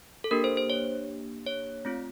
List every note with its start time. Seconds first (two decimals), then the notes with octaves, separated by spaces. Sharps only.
0.24 A4
0.31 A#3 D4 G4 A#4
0.44 C5
0.57 C5
0.70 C#5
1.46 C#5
1.85 A3 C4 F4